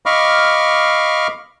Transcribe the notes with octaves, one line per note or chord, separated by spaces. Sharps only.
D#5 F5 B5 C#6 D6 F6